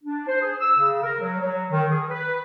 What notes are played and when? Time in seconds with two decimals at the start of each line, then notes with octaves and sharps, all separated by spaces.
0.03 D4
0.28 C5
0.41 G#4
0.60 E6
0.79 C#3
1.03 A#4
1.21 F#3
1.40 F#3
1.71 D#3
1.91 G#4
2.09 B4